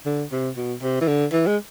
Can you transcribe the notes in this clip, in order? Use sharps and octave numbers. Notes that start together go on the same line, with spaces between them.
D3
C3
B2
C3
E3
D3
E3
G#3